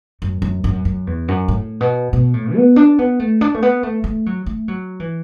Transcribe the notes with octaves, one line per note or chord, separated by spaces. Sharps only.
F#2
F#2
F#2
F#2
E2
F#2
A2
B2
B2
A2
B3
D4
B3
A3
D4
A3
B3
A3
A3
F#3
A3
F#3
E3